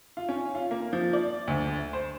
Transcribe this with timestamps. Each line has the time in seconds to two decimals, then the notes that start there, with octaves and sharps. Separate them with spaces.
0.17 F4
0.29 C#4
0.55 F4
0.71 A#3
0.93 F3
1.13 D5
1.48 D2
1.93 C5